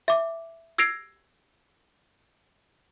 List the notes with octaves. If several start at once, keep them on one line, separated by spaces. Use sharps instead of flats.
E5 D6
E6 G#6 A#6 C7 D7 F7